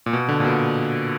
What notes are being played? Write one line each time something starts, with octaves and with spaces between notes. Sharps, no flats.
A#2
B2
D3
A#2
B2